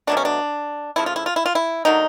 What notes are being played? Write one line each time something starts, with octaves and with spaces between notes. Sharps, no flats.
B2 F#3 A3 D4
C#4
D4
C#3 F3 A3 E4
F4
E4
F4
E4
F4
E4
D3 F#3 A#3 D#4